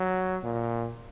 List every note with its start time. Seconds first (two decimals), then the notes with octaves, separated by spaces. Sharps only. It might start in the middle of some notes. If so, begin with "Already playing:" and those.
Already playing: F#3
0.43 A#2